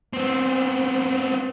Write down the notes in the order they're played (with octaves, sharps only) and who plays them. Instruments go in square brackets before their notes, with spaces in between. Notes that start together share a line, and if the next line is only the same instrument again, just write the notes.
[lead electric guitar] B3 C4